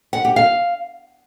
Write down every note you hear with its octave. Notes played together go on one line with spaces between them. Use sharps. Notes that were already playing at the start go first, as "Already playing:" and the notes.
F#5
G4
F5